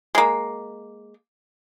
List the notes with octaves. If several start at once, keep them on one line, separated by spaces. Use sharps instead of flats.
G#3 A#3